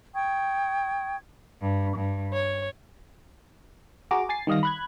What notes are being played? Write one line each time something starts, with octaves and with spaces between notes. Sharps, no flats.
G5 C#6 D#6 G#6
G2
G2
C#5
F#4 G#4 A#5 D6
G#5 A6 C7
D#3 G3 D#5 F5 A#6
B5 F#6 G#6